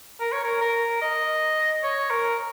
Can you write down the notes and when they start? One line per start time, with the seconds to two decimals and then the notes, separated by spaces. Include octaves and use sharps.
0.20 A#4
0.32 C#5
0.44 A#4
0.61 A#4
1.01 D#5
1.84 C#5
2.10 A#4